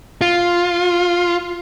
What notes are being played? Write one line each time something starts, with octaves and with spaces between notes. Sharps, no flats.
F4